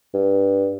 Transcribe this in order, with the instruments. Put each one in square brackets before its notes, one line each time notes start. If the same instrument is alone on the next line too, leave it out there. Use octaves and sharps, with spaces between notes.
[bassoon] G2